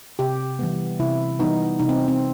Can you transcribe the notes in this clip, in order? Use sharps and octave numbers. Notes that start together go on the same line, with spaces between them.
C3 G4
E3 G3 B3
C3 E4
E3 G3 B3 D#4
C3 D#4
C4
C4